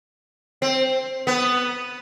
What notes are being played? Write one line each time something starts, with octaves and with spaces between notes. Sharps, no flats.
C4
B3